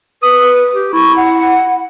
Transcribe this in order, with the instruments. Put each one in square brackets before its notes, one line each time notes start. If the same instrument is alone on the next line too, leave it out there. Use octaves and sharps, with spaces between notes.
[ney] B4 [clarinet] D#6
[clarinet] G4
[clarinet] E4 [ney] C#6
[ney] F#5
[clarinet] E4